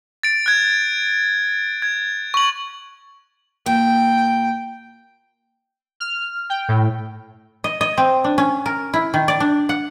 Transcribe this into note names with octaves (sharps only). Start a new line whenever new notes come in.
A6 D7
F#6 G#6
G#6
C#6 F#7
A#2 G5
F6
G5
A2
D#5
D#5
C4
D4
C#4
A#4
E4
D#3
D5
D4
F#5